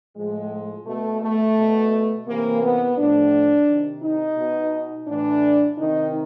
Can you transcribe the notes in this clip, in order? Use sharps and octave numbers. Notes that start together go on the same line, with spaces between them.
A2 F3 G#3
B2 A3
A3
B2
C3 E3 A#3
B3
A2 F3 D4
C3 D#3
D#4
B2
A2 E3 D4
C3 D#3 D#4